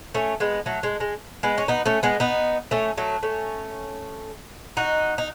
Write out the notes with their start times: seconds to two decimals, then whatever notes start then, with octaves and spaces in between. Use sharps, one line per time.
0.14 A3 C#4
0.40 G#3 B3
0.66 F#3 A3
0.83 G#3
1.00 G#3
1.43 G#3 B3
1.58 C#4
1.68 B3 D#4
1.86 A3 C#4
2.03 G#3 B3
2.20 B3 D#4
2.71 A3 C#4
2.97 F#3 A3
3.23 A3 C#4
4.77 D#4 F#4
5.18 D#4